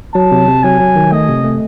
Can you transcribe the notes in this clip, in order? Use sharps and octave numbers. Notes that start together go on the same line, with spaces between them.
F#3 A5
C3
C3
F#3 G#5
F#3
D#3
A3 D#5
C3
A3